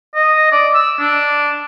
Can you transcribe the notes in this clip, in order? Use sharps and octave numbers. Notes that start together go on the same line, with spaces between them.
D#5
D5
E6
D4